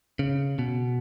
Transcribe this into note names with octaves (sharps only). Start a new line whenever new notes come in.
C#3
B2